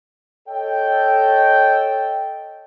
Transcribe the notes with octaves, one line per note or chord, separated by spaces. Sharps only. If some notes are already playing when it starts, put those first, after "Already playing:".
A4 C#5 D#5 G5